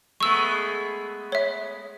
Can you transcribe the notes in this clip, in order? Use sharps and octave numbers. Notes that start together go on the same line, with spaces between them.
G#3 A3 B3 C#6 E6
C#5 E5